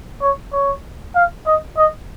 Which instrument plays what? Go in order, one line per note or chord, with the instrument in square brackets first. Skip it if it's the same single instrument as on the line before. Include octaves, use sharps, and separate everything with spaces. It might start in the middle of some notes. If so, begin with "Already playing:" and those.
[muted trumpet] C#5
C#5
F5
D#5
D#5